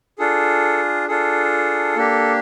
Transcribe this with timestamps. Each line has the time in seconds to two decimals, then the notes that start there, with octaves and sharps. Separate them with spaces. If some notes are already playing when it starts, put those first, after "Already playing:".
0.19 D4 F4 G#4 A4
1.08 D4 F4 G#4 A4
1.96 A#3 D4 G4